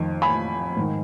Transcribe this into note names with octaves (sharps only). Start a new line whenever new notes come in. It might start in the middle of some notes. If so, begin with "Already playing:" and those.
Already playing: F2 D#3
G#5 B5
G#2 D#3